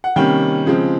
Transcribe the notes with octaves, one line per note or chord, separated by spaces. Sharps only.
F#5
C3 D#3 G3 A#3 C#4 G5
C#3 F3 G#3 C4